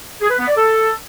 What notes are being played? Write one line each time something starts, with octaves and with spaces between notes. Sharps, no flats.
G#4
B4
B3
D5
A4